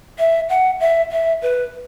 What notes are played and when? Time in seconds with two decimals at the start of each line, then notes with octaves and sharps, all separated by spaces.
0.19 E5
0.49 F#5
0.80 E5
1.12 E5
1.42 B4